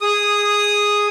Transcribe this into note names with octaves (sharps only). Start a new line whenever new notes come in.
G#4 D#6